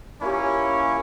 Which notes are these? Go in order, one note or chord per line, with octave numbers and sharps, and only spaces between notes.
A#3 C#4 E4 F4 G4